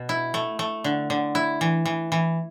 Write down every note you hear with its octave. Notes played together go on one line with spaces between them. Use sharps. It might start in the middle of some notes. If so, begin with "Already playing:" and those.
Already playing: B2 B3
E4
A3
A3
D3
D3
E4
E3
E3
E3